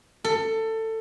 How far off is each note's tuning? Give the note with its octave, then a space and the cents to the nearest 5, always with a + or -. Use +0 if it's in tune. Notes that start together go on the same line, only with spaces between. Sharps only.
A4 +20